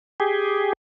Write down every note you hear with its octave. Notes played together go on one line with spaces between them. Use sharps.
G4 G#4